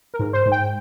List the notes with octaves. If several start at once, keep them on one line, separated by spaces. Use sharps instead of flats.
A#4
G#2
C5
G#2
G5